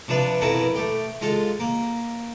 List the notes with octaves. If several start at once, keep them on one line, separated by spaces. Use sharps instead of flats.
C3 F3 D4 B4
F2 B2 E4 A#4 B4 A5
A3 G4
G#3 F4 A4
A#3